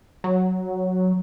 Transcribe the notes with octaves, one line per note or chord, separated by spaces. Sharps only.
F#3